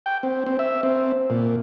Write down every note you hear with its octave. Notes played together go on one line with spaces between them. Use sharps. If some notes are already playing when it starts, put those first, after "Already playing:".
G5
C4
C4
E5
C4
A#2